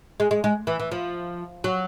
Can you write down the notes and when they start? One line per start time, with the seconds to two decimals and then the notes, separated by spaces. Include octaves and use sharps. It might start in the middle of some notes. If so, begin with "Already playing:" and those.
0.20 G#3
0.31 G#3
0.44 G#3
0.67 E3
0.80 E3
0.92 F3
1.64 F#3